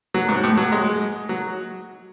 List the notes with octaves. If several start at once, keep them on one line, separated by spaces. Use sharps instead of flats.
F#3
G#2
A2
F#3
G#3
F#3